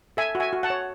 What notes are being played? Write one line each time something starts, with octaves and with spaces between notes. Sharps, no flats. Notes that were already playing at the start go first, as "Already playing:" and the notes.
A4 E5 G#5
F#4
E5 G#5
F#4
F#5 A5
C#5